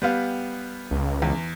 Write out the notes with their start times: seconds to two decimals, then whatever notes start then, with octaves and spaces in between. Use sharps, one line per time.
0.02 G3 B3 F5
0.91 C#2
1.22 E2